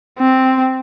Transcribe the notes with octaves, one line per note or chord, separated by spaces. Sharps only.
C4